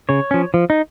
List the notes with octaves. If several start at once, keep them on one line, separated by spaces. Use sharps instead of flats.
C#3 C#5
F3 C#4
F3
D#4